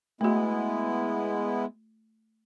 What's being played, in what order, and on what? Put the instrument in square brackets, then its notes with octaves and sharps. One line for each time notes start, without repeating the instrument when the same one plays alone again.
[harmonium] G#3 B3 E4 [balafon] A3 F#4